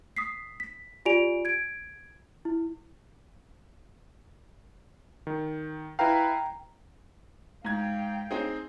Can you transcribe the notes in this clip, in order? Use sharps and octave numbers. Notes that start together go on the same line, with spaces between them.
D#6 B6 C7
B6
F4 G4 D5 G#5 D7 F7
G#6 D7
E4
D#3
E4 B4 F5 G5 A#5
G#2 F5 G5 G#6
C4 D#4 G#4